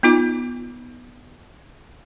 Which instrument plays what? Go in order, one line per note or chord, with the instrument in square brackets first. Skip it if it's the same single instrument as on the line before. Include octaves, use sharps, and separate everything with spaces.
[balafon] B3 D#4 F4 D6